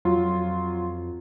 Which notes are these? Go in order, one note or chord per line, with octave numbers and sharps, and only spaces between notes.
F2 F#3 F4